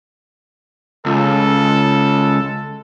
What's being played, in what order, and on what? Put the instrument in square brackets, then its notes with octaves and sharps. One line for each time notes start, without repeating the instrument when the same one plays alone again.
[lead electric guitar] C#2 [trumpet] A4